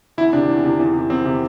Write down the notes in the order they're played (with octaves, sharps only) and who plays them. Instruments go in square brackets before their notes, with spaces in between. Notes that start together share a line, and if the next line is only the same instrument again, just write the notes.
[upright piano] E2 [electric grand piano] E4
[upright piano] C3 D#3 [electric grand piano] D4
[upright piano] E2
C3 D#3
E2
C3 D#3
[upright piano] E2 [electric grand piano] C4
[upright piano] C3 D#3